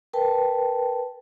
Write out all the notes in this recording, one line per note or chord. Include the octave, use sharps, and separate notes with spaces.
A#4 B4 G5 A5